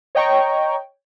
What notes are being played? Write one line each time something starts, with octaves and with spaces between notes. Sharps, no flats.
C#5 D#5 G5 A#5 C#6